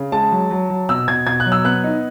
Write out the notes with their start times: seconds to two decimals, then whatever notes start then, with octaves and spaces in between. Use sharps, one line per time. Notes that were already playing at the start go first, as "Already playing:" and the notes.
Already playing: C#3
0.12 G#3 A5
0.31 F#3
0.51 F#3
0.70 F#3
0.89 B2 E6
1.08 B2 G#6
1.27 B2 G#6
1.40 F#6
1.46 F#3
1.52 E6
1.65 B3 F#6
1.84 D#4